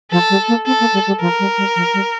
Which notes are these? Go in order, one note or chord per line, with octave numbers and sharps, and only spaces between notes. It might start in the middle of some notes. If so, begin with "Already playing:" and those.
F3 A4
G3
A#3
C4 A4
A#3
G3
G3
F3 A#4
G3
G3
F3
G3